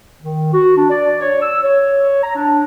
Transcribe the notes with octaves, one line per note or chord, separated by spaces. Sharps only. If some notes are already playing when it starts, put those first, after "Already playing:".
D#3
F#4
D4
D5
C#5
E6
C#5
A#5
D4